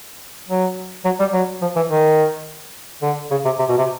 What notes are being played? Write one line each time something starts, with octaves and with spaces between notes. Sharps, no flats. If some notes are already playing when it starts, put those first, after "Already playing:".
F#3
F#3
G3
F#3
F3
E3
D#3
D3
C#3
C3
C3
B2
C3